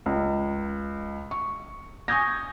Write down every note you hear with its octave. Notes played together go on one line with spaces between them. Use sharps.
C#2
C#6
G#5 C#6 D#6 G6 G#6 A#6